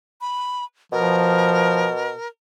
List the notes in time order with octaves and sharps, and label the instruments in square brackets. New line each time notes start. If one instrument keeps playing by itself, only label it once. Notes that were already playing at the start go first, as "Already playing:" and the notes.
[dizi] B5
[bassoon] B2 [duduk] F3 [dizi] A#4